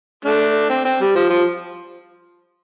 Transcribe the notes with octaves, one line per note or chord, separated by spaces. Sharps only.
A3 D4
C4
C4
G3
F3
F3